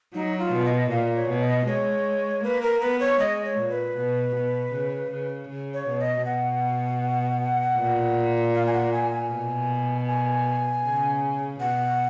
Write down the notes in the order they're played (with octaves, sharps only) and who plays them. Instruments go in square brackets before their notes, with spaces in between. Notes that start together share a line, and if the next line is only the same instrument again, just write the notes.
[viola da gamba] F#3 [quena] D#4
[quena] F4
[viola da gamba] B2
[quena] D#5
[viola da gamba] A#2 [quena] F5
[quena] C#5
[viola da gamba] B2
[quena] D#5
[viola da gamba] G#3 [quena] C#5
[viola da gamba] A#3 [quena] B4
[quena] A#4
[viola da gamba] B3 [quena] B4
[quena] C#5
[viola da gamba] G#3 [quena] D#5
[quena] C#5
[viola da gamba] A#2
[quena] B4
[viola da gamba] B2
B2
C#3
C#3
C#3
[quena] C#5
[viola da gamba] B2
[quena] D#5
[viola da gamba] B2 [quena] F#5
[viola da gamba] A#2
[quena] F5
G#5
F#5
G#5
G#5
[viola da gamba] B2
[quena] G#5
[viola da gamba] C#3
[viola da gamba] B2 [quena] F#5